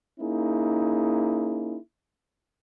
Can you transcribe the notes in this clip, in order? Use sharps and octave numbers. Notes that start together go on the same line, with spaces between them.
A#3 C#4 D#4 E4 G#4